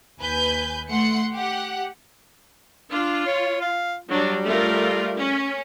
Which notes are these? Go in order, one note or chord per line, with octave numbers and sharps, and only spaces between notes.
D#2 B4 G#5 G6
A3 F#5 C6 C#7
G4 F#5
D4 F4
C#5
F5
F#3 G3 D4
A3 F4 A#4
C#4